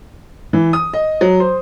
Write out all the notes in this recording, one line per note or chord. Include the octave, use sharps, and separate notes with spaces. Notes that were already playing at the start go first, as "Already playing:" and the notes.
E3
D#6
D#5
F#3
C5